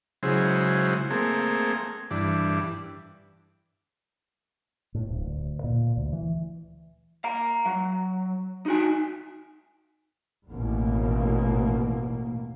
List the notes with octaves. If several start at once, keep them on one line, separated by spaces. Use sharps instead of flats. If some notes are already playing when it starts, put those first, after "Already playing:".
C#3 F#3 G#3 E4 C5
A3 A#3 C4 G#4
G2 E3 D4
A2
D1
D2
A#2
D2
E3
F5 A#5
F#3
D#4 F#4 G#5
A1 D#2 B2 A#3